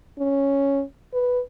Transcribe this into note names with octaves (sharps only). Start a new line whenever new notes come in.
C#4
B4